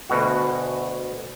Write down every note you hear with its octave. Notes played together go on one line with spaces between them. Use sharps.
D2 B2 F#4